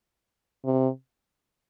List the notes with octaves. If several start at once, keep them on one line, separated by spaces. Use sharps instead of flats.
C3